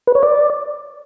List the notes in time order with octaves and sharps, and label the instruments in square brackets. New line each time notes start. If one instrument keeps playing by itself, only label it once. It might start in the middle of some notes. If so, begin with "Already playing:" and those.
[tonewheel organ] B4
C#5
D5